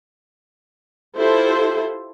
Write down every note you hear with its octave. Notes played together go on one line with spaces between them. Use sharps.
E4 F4 G4 A4 C5